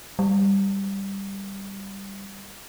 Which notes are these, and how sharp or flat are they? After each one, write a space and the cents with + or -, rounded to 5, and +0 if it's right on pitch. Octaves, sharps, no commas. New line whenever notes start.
G3 +5